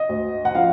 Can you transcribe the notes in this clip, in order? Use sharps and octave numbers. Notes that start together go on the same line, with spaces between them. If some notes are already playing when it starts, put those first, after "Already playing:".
Already playing: D#5
D2
F#5
F3 F5